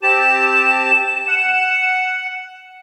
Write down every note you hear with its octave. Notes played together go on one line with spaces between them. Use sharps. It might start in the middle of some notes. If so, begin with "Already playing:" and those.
C4 G4 A5 E7
F#5